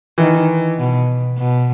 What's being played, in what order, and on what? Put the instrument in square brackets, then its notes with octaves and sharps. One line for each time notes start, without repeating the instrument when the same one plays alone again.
[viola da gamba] D#3 [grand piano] E3
[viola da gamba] B2
B2